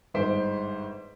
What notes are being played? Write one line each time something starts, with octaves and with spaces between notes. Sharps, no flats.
G1 G#2 C5 B6 D7